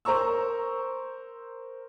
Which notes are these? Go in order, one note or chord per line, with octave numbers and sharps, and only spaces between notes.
A#4 C5 A#5 C#6 E6